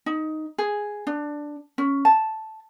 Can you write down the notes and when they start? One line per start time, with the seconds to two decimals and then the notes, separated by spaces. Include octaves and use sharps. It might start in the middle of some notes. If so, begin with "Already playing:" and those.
0.06 D#4
0.58 G#4
1.07 D4
1.78 C#4
2.05 A5